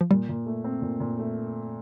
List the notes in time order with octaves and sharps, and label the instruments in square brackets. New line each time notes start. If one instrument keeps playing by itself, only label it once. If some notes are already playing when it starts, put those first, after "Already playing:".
[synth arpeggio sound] F3
[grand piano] A#2 [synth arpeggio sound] G3
[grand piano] A#2
A3
C4
A#2
A#2
A3